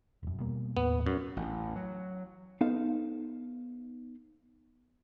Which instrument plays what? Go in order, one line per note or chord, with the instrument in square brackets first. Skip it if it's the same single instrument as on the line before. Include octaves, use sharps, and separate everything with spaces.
[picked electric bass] E1 F#2
B2 G3 A#3
[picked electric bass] D#2 A2 [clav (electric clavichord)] B3
[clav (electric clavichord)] F#2
[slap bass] A1
F#3
[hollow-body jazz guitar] B3 D#4 A4 C5 F5